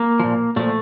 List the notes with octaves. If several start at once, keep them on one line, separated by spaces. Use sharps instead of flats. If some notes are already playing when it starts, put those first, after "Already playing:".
Already playing: A#3
A#2 F3
A#2 F3 A3